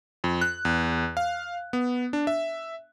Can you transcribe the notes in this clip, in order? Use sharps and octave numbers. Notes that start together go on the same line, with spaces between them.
F2
F#6
E2
F5
B3
D4
E5